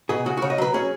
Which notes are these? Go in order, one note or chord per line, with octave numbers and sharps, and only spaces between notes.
B2 G#4
C#3 F#4
C#3 F#4
D#5
F#3 B4
C#4 G#4